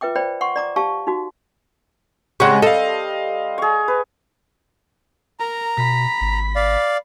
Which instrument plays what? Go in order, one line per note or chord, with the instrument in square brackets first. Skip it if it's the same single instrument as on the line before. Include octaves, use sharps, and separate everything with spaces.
[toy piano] F4 B4 E5 G5 D6
C5 D5 G5 B5
F#5 C6 C#6
D5 A#5 D6
G4 F5 A5 C#6
D#4 F#4
[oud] C#3 G#3 [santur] G3 C4 C5 [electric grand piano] F#5 C#6
[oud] A4 [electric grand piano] D#5 F5
[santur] G#4 C#6
B4
[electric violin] A#4 [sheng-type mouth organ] A#5
[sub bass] B2 [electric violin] B5 B6
[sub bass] G#1
[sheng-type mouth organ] D5 F5